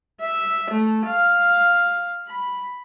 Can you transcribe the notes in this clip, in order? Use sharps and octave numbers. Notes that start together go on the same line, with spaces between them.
E5
A3
F5
B5